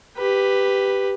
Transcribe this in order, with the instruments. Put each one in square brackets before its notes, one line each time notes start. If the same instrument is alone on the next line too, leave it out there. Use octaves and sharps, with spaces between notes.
[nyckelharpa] G4 B4